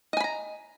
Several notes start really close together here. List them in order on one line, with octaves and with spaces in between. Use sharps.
D#5 G#5 B5 A#5